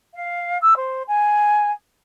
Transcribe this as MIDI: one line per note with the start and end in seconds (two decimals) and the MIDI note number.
0.14 0.58 77
0.61 0.74 88
0.76 1.03 72
1.07 1.71 80